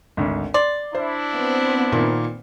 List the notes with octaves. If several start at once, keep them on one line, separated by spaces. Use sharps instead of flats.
G#1 D2
D5 C6
D4 E4 C5
B3 C4
A#2 D#3 A#3